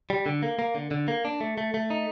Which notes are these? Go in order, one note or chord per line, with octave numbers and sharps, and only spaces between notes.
G3
D3
A#3
A#3
D3
D3
A#3
D4
A3
A3
A3
D#4